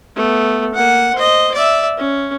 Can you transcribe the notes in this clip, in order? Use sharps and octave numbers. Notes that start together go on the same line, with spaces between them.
A3 B3
A#3 F#5
C5 D#5
D5 E5
C#4